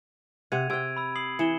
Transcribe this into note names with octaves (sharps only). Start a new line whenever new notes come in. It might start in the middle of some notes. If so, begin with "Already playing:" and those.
C3 F#5 G#6 D#7 F7
C3 G5 E6 G#6 D7
B5 E6
D#6 C7 F#7
E3 C#7 E7 G7